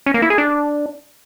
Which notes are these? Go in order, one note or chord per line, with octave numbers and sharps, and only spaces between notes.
C#4
A#3
E4
G#4
D4